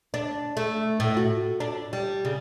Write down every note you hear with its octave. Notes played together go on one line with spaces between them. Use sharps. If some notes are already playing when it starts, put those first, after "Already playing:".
D4
A3
A2
F#4
D4
G3
C#3